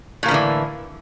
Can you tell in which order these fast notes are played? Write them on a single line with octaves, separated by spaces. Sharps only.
A2 A#3 F3 D3 E3